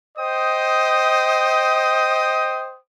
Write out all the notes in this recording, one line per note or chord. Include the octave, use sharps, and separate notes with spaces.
C5 D#5 G5 D#6